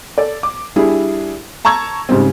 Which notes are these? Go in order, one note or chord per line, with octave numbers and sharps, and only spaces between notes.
A4 D5
D6
G3 D4 E4 G#4
A5 A#5 C#6 E6 G#6
G#2 C#3 G3 C4